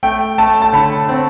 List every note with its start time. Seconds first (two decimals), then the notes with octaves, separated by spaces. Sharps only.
0.03 A3 G5
0.38 A3 A5
0.62 A5
0.73 D3 B5
1.09 C4